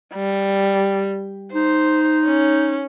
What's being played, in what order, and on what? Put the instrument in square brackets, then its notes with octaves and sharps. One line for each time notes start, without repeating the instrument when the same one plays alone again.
[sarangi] G3
[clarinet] D#4 [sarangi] C5
[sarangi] C#4